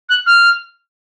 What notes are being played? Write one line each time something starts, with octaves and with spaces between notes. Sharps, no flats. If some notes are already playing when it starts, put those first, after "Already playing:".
F#6
F6